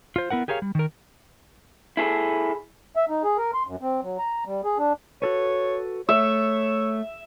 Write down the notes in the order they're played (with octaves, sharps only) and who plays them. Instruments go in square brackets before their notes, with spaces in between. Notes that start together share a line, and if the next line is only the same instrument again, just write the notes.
[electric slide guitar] F4 C5
B3 E4 A#4 F#5
G4 G#4 A#4 C#5 F5
G3
D#3 A#4
[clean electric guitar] E4 G#4 A4
[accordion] E5
D#4
G#4
A#4
C6
F#2
C4
F#3
A#5
G3
G#4
D4
[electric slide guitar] F#4 A4 B4 [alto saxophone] C#5
[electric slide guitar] A3 [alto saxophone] C#5 [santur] E5